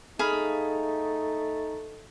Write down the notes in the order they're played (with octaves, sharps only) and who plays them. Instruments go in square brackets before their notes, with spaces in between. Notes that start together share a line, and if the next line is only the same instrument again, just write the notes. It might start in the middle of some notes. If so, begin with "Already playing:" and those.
[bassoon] A3 [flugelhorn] D#4 [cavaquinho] G#4 F5 B5